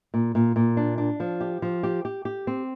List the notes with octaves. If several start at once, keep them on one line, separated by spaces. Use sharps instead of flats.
A#2
A#2
A#2
D4
D4
F3
G4
F3
G4
G4
G4
C4